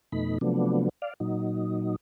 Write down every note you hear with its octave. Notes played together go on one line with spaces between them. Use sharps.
F2 B2 A3 D#4 B5
C3 F3 F#3 A3 B3 D4
D5 F5
A#2 F#3 D#4